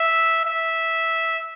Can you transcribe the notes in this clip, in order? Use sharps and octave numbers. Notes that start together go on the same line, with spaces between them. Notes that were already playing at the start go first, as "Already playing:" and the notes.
Already playing: E5
E5